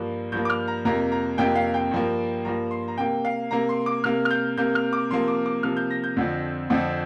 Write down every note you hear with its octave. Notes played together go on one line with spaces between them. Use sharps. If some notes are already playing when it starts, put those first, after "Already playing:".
Already playing: G2 F3 A#3
G2 F3 A#3 G6
D6
F6
A#5
F2 C3 A#3 A#5
A#5
F2 C3 A#3 G5
F5
G5
G2 F3 A#3
G2 F3 A#3 A#5
C6
A#5
C3 A#3 G5
F5
C3 A#3 A#5
C6
D6
C3 A#3 F6
F6
G6
C3 A#3 G6
F6
D6
C3 F3 A#3 C6
D6
D6
C3 F3 A#3 F6
G6
A#6
G6
F2 D3 F3 C4
F2 D3 F3 C4